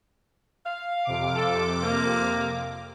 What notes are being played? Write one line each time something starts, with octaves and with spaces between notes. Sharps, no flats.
F5
F2 C3 D6
A4
A#3